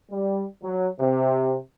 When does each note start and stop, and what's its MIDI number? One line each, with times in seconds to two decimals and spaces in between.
0.11 0.44 55
0.63 0.87 54
1.00 1.56 48